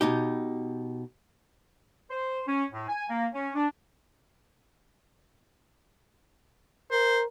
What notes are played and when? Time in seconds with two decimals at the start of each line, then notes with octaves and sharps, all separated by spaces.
0.01 B2 D#4 G4
2.10 C5
2.47 C#4
2.72 A2
2.88 G#5
3.09 A#3
3.33 C#4
3.55 D4
6.91 A#4 C5